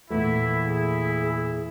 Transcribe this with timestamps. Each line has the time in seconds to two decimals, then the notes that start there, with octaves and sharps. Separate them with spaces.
0.10 E2 A#2 A3 E4
0.66 E4 G#4